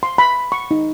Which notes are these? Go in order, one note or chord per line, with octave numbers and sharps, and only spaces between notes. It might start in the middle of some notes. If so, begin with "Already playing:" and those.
C6
B5
C#6
D#4